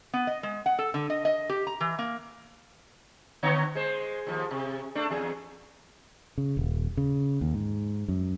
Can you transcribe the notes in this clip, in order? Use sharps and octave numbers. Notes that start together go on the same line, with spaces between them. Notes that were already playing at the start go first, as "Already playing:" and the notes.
B3
D#5
G#3
F#5
A4
D3
D#5
D#5
G4
A#5
E3
A#3
D3 B3 C#5
G#3 C5
D#2 F3
C3
A3 D4
E2 G#4
C#3
D#1
C#3
D#2
G#2
F#2